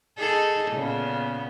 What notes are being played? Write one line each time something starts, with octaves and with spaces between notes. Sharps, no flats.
D#4 G#4 A4
A#2 C#3 B3